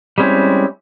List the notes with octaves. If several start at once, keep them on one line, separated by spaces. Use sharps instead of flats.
G3 G#3 C4 C#4 E4